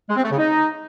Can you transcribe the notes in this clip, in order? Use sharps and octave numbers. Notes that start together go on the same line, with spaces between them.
G#3
C4
A3
C#3
D#4